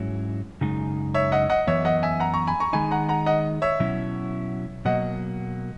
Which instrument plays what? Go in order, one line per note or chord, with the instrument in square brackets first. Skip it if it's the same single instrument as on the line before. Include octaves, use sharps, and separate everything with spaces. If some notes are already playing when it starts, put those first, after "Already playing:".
Already playing: [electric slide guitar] G#2 F#3 C#4 E4
F#2 C#3 G#3 D#4
[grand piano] C#5 E5
D#5 F#5
D#5 F#5
[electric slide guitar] F#2 E3 B3 [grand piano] C#5 E5
[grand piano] D#5 F#5
E5 G#5
F#5 A#5
A#5 C#6
G#5 B5
A#5 C#6
[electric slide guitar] D#3 G#3 D#4 [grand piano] G#5 B5
[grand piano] F#5 A#5
F#5 A#5
D#5 F#5
C#5 E5
[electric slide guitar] B2 F#3 C#4 E4
[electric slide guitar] B2 F#3 A#3 [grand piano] D#5 F#5